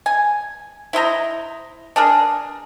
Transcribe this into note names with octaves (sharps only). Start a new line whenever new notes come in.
G#5
E4 C5 D#5 A#5
D4 G#4 A#4